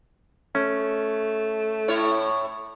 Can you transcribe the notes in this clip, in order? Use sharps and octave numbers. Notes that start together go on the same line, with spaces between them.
A3 C#4
A2 E4 C#5